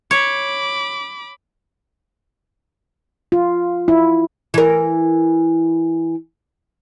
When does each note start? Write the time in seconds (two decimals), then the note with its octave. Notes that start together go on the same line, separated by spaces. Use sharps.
0.11 C#5 B5 D6
3.32 F4
3.88 E4
4.54 E3 A#4